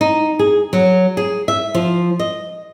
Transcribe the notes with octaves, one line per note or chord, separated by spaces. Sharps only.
D#4
G#4
F#3
G#4
E5
F3
D#5